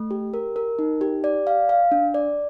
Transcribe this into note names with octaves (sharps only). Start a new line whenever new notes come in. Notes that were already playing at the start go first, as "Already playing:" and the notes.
Already playing: A3
G4
A#4
A#4
D#4
G4
D5
F5
F5
D4
D5